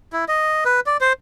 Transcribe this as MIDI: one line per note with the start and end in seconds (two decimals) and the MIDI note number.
0.13 0.25 64
0.28 0.64 75
0.65 0.80 71
0.86 0.97 74
1.01 1.13 72